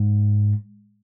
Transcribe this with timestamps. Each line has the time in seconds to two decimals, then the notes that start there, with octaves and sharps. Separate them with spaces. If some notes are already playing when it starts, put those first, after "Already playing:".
Already playing: G#2